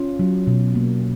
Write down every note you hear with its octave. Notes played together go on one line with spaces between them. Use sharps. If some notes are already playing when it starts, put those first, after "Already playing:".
Already playing: C#4 F4
F#3
B2
A#3